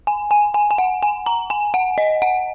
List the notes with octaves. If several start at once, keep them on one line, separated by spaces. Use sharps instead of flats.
G#5
G#5
G#5
G#5
F#5
G#5
A#5
G#5
F#5
D#5
F#5